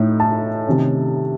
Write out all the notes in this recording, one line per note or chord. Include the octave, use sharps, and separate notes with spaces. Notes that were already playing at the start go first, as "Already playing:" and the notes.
Already playing: A2 A3 D#4
A5
C3 D#3 A3 C#4